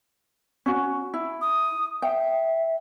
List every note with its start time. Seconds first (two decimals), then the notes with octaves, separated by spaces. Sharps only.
0.66 C#4 F#4
1.14 E4
1.41 D#6
2.02 E5 G5